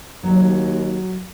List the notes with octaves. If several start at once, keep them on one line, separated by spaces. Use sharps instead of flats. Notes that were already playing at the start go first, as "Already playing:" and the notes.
D#2 F#3